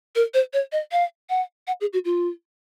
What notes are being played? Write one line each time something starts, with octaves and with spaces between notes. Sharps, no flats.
A#4
C5
C#5
D#5
F5
F#5
F#5
G#4
F#4
F4